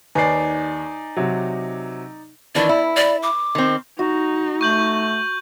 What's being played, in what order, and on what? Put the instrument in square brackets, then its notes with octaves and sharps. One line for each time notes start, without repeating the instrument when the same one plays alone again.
[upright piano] D#2 B4 [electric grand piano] D#4 D5 [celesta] G#5 C7
[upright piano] C3 F#3
[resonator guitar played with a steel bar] D#3 E3 D4 [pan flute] D5
[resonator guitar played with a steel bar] E4
[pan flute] D5
D6
[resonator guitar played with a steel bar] D#3 C4
[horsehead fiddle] D#4 [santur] F#4
[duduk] A3 [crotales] C#6 G6 F#7